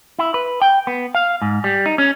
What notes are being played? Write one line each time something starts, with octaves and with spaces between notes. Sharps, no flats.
E4
B4
G5
B3
F5
G#2
G3
D#4
C#4